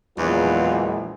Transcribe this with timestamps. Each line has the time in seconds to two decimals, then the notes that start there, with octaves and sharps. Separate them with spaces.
0.18 A#1 E2 E3 F#3 G#3 F4 F#4